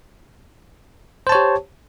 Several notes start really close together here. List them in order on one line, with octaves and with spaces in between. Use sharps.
C5 A5 C#5 G4